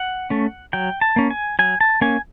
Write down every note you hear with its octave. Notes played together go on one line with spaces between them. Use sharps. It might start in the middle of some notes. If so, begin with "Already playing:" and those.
Already playing: F#5
A3 C#4
F#3 G5
A5
A#3 C#4
G#5
F#3 G#5
A5
A#3 C#4 G#5